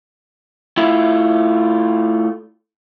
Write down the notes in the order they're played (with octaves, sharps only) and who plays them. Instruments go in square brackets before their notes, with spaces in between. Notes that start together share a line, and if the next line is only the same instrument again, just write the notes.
[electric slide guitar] A3 E4 F4 E5